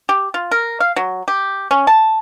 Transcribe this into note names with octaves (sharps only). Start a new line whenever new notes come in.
G4
F4
A#4
F5
F#3
G4
C#4
A5